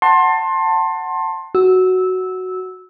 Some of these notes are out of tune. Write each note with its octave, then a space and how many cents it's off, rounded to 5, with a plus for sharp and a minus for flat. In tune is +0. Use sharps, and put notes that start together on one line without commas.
F#5 +5 A5 +20 C6 +25
F#4 +5 E6 -15